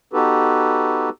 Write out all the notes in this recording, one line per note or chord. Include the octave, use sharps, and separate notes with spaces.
B3 D#4 F#4 G4 A4 B4